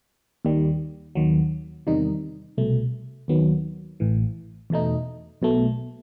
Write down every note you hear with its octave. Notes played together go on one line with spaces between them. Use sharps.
D#2 D#3 G3
D#2 D#3 F#3
E2 C3 D#3 G3 D#4
C2 B2 A3
D#2 D#3 F#3 B3
A1 A2 E3
E2 B2 A3 D#4
B1 B2 A3